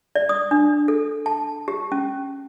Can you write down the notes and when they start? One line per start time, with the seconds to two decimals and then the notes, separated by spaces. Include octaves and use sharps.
0.15 D5
0.29 D#6
0.51 D4
0.88 A4
1.26 A5
1.68 G4
1.92 C#4